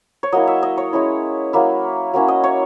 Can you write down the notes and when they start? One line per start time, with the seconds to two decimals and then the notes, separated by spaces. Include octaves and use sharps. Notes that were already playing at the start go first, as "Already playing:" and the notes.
0.23 C#5
0.32 F#3 A#3 E4 D#5
0.47 E5
0.63 D#5
0.77 C#5
0.93 G#3 C#4 E4
1.53 F#3 A#3 E4
2.13 F#3 A#3 C#4 E4
2.28 D#5
2.44 C#5